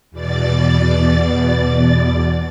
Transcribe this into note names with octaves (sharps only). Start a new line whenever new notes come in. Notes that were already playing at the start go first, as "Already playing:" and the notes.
E2 B2 D5 A6